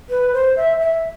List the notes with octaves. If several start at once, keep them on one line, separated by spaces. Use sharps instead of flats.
B4
C5
E5
E5